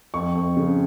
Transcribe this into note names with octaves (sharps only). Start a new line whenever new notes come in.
F2 C#6
F2
C#3